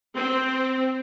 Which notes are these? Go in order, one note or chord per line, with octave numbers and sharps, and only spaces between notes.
C4